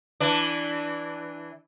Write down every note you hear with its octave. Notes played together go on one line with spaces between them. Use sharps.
E3 D4